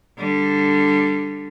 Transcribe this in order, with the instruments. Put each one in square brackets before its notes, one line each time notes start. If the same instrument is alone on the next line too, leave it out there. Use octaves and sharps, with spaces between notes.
[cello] D3 G3